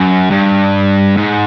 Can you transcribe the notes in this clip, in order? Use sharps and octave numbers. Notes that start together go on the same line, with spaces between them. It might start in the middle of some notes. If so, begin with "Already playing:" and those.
Already playing: F#2
G2
G#2